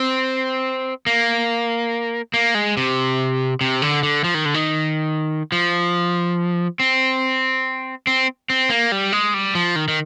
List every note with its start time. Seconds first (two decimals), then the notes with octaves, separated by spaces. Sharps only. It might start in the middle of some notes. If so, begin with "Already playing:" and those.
Already playing: C4
1.06 A#3
2.34 A#3
2.55 G#3
2.77 C3
3.61 C3
3.82 D3
4.03 D3
4.24 F3
4.34 D#3
4.45 D3
4.54 D#3
5.52 F3
6.80 C4
8.07 C4
8.50 C4
8.70 A#3
8.92 G3
9.13 G#3
9.34 G3
9.55 F3
9.76 D#3
9.88 D#3